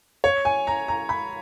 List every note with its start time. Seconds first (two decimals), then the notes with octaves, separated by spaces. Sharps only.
0.24 C#5
0.45 G#5
0.67 A#5
0.88 A#5
1.09 B5